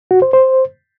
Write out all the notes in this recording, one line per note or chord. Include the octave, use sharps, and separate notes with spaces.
F#4
C5
C5